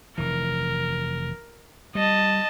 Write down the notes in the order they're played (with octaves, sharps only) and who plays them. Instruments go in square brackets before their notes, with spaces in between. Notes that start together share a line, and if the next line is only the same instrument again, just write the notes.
[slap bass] F1 E3 [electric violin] A#4
[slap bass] G3 [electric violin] D#5 A5